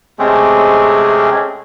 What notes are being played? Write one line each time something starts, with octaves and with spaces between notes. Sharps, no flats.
C3 G#3 A3 C4 C#4 G#4